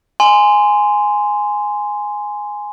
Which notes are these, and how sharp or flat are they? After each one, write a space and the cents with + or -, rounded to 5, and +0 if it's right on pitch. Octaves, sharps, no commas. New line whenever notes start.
G#5 +0 C6 -10